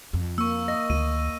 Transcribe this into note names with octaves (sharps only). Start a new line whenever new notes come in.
F2
A#3 C#6 E6
D#5 A#6
D2 D#3 D#7